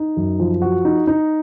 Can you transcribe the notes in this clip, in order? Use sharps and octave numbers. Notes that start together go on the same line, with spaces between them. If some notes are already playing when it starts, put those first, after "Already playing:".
Already playing: D#4
F#2
F3
F#4
D#4
D#4